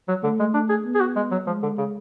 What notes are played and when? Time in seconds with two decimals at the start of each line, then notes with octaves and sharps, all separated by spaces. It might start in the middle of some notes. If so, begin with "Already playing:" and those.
0.08 F#3
0.23 D3 A3
0.39 G#3
0.54 D4
0.69 G#4
0.85 B3
0.95 G#4
1.00 F#4
1.16 G#3
1.31 F#3
1.47 F3 G#3
1.62 D3
1.78 C#3